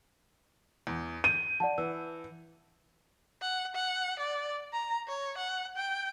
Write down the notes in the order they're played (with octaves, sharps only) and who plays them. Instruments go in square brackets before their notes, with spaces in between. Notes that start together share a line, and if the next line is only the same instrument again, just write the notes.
[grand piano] E2
[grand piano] G6 [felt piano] D#7
[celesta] D5 F#5 A5
[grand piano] E3 [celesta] E6
[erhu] F#5
F#5
D5
A#5
C#5
F#5
G5